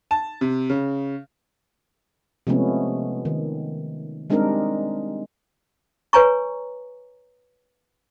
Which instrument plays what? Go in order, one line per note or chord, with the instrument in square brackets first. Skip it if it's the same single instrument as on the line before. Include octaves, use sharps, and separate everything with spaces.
[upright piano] A5
C3
C#3
[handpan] C3 F3 G#3 A3 B3 C#4
D#3
G3 G#3 C4 D4 D#4 A#4
[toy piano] B4 C#5 G#5 A#5 C#6